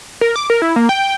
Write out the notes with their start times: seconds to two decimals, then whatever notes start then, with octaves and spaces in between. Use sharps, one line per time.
0.21 A#4
0.36 D6
0.50 A#4
0.62 E4
0.76 A#3
0.89 G5